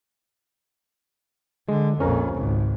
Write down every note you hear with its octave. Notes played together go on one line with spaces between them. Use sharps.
D3 G#3
A#1 F2 C#4 A#4
G#1 C#2